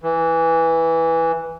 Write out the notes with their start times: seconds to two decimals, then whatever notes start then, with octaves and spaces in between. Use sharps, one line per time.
0.03 E3